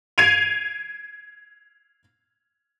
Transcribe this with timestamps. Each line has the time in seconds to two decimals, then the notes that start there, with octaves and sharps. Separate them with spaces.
0.18 G#6 C7 D7 D#7 F7